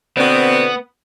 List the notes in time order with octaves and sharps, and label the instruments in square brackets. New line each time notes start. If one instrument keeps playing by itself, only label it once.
[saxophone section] B2 D3 C4 [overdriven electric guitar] B3